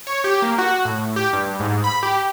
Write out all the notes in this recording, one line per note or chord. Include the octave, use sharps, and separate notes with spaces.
C#5
G4
A#3
F#4
A2
G4
G2
G#2
B5
G4